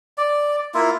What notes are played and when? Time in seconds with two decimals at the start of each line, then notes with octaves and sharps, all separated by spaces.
0.18 D5
0.74 A#3 E4 F4